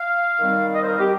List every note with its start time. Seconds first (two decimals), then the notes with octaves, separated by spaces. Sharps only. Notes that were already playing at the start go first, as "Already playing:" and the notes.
Already playing: F5
0.39 D#3 G3 C4
0.75 D#5
0.82 C5
0.87 A#4
0.99 G4